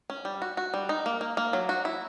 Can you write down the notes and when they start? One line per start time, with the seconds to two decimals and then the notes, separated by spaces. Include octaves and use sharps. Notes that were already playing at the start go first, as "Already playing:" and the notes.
0.10 C#4
0.25 G3
0.42 F#4
0.57 F#4
0.74 G3
0.89 D#4
1.06 A#3
1.21 A#3
1.37 A#3
1.53 F#3
1.69 F#4
1.85 E4